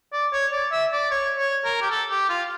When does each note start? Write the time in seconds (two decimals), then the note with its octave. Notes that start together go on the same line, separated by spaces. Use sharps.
0.13 D5
0.33 C#5
0.53 D5
0.72 E5
0.92 D5
1.11 C#5
1.38 C#5
1.65 A#4
1.81 G4
1.91 A4
2.11 G4
2.29 F4